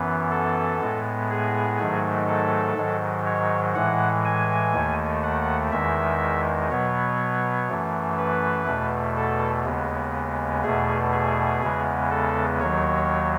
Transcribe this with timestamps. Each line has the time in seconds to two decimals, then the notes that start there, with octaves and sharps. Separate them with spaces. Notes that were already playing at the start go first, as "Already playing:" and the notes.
Already playing: F#2 E3 B3
0.31 A4
0.81 A2 G#3 B3
1.30 G#4
1.79 G#2 D#3 F#3 A3
2.28 A4
2.76 G#2 D#3 F#3
3.26 C#5
3.75 A2 E3 G#3 F#5
4.25 G#5
4.73 D#2 D#3 A3
5.23 F#5
5.71 E2 D#3 G#3 E5
6.70 B2 F#3 B3 C#5
7.69 F#2 E3 A3
8.18 B4
8.67 E2 B2 A3
9.17 A4
9.65 D#2 C#3 G#3 B3
10.63 E2 B2 A3 G#4
11.12 G#4
11.62 E2 C#3 G#3 B3
12.10 A4
12.60 D#2 D#3 F#3 C#5